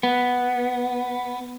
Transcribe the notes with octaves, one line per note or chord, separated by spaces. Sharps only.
B3